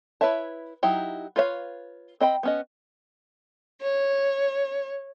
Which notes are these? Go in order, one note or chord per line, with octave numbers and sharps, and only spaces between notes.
E4 B4 C#5 E5 A5
F#3 D#4 E4 G4
F4 B4 C#5 E5 F5
C4 D#5 G5 B5
B3 C#4 D#5
C#5